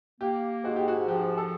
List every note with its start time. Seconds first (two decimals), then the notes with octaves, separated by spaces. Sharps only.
0.20 A#3 G4
0.64 G#2 F#4
0.76 G4
0.88 F#4
1.08 F3 G4
1.37 A4